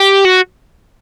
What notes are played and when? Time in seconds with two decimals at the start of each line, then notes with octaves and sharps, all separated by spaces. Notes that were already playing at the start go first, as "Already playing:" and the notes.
Already playing: G4
0.25 F#4